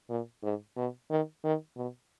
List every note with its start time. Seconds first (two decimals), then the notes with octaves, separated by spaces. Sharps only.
0.10 A#2
0.43 G#2
0.77 B2
1.10 D#3
1.44 D#3
1.76 B2